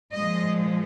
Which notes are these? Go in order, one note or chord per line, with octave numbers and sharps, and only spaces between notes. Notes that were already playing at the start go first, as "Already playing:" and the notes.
A#2 F3 G#3 D#5